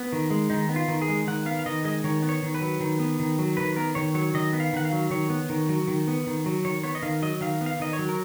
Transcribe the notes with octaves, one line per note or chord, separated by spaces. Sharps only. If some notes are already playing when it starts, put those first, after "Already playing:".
Already playing: B3
D#3
G#3
D#3 D#4
B3
F4
D#3
G#4
G#3
D#3 F#5
B3 F5
F5
D#3 D#5
G#3 D#5
D#3 C#5
B3
C#5
D#3
B4
F#3
D#3
B3
D#3
F#3
D#3 B4
B3 A#4
D#3 C#5
F#3 C#5
D#3 D#5
B3
F5
D#3 F#5
F5
F#3
D#3 C#5
B3
D#3
F#3
D#3
B3
D#3
F#3
D#3 C#5
B3 C#5
D#5
D#3 F5
F#3 D#5
D#3 F5
B3
F5
D#3 D#5
C#5
F#3
A#4